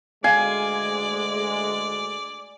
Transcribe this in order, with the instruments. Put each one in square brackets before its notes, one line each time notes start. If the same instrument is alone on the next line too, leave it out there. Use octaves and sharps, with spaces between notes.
[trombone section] D2 G#3 [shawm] D5 [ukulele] F5 [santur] G#5